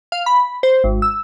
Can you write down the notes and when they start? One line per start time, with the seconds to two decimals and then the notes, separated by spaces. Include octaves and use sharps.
0.12 F5
0.26 B5
0.63 C5
0.84 G#1
1.02 E6